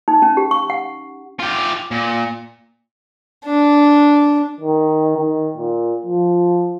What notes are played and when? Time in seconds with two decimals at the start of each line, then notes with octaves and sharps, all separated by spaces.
0.08 D#4
0.22 C#4
0.37 G4
0.51 C#6
0.70 F#5
1.40 F4 G4
1.91 A#2
3.45 D4
4.60 D#3
5.17 D#3
5.57 A#2
6.06 F3